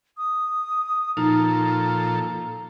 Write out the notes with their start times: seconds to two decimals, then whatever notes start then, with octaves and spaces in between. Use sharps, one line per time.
0.17 D#6
1.17 A#2 F3 D#4 A4 A#5